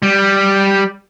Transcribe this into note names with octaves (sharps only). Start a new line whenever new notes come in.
G3